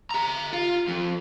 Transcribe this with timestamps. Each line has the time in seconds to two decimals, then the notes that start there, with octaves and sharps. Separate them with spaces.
0.11 G4 A#5
0.53 F4
0.88 F2